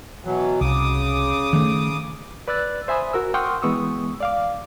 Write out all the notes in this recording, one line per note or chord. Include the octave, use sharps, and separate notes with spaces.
B2 E3 F#3
C2 C#3 D6 D#6
D#3 A3
B4 D5 E6 F#6 A6
C5 E5 G#5 B5 D#6
F#4 A#4 E6
F#5 G5 C6 C#6 D#6 F6
E3 G#3 B3 C#6 D#6 E6
D5 F5 D6